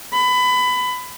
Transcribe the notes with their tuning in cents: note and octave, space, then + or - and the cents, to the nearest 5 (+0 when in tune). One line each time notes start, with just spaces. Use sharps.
B5 +20